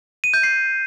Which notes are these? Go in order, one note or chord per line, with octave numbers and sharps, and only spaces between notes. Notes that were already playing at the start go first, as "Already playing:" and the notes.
D#7
G6
C7